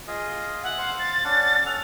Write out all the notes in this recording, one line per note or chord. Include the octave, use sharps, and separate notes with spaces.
F4 G#4 D#5
E5 F#5 G#5
C5 F5
A6
C#4 D4 F#5
C#4 A4 F#5 F7